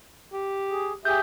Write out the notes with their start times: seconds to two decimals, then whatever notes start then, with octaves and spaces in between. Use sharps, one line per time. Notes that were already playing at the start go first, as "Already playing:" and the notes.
0.33 G4
0.71 G#4
1.05 G4 G#4 E5 G#5 G6